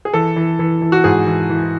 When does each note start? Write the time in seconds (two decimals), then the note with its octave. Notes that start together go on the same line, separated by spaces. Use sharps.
0.05 G#4
0.14 E3 A4
0.36 E3
0.59 E3
0.82 E3
0.92 F#4
1.04 G#2 G#4
1.27 E3
1.49 E3